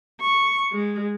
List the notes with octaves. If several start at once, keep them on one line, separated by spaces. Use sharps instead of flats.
C#6
G#3